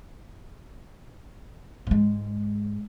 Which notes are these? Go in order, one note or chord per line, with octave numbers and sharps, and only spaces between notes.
G#2 G#3